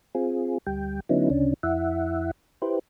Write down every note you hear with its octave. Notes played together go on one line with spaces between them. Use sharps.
C4 F4 G#4
D2 G3 G5
D3 F#3 B3 C#4 D#4 E4
D2 C#3 C#4 D4
F2 E4 E5 F#5
E4 G4 B4 C5